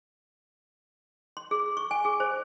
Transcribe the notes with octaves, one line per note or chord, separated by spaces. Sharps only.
C6
G#4
C#6
G#5
G#4
C5